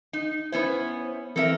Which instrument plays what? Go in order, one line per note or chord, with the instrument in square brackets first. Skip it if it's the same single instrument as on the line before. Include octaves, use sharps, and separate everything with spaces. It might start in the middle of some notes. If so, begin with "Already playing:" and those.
[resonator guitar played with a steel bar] D#4
[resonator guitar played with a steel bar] B3 C#4 E4 [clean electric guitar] C5
[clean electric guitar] E3 C4 [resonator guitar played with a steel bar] A4 A#4 E5